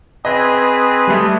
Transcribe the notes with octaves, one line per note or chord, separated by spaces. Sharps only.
C4 G#4 B4 D#5
G3 A3